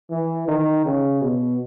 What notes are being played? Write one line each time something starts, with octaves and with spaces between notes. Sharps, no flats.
E3
D#3
C#3
B2